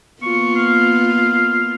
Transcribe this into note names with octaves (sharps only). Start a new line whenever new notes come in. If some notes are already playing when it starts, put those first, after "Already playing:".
A#3 B3 F4 C#6
F5